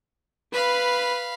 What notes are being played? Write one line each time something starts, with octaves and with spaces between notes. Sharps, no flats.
B4 F5 B5